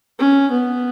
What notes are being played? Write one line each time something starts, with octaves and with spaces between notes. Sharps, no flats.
C#4
B3